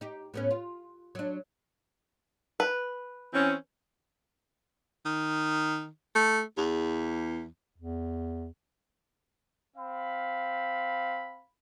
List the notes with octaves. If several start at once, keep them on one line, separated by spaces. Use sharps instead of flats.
D#4 G4
A2 B3 C#4
F4
F#3 D4
B4
E3 C4 C#4
D#3
A3
E2
E2
C4 F5 B5